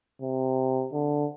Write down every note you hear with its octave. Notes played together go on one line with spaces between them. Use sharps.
C3
D3